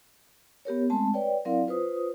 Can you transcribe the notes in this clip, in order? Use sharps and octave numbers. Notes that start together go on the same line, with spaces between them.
B3 G4 A#4 C#5
G#3 A3 C4 A5
B4 C#5 D5 G5
F#3 C4 E4 A#4 D5 F5
F4 B4 C5 D#6